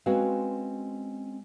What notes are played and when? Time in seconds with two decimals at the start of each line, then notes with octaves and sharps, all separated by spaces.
0.06 G#3 C4 C#4 F#4 B4 F5